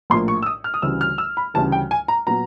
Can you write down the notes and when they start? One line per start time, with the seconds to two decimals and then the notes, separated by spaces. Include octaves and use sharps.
0.10 A#1 A2 F3 A#3 C6
0.28 C#6
0.42 E6
0.46 D#6
0.64 F6
0.74 D#6
0.82 D2 C#3 E3 G3 E6
1.01 F6
1.18 E6
1.37 B5
1.54 D2 C#3 E3 G3 A5
1.72 G5
1.91 G#5
2.08 A#5
2.27 A#2 F#3 B3 A#5